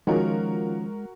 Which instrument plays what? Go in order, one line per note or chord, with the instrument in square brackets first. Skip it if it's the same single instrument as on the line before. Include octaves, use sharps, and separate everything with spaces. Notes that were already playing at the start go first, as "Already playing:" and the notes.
[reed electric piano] D#3 C#4 F4 [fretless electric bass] F3 [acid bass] G#3 [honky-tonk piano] F#4 A#4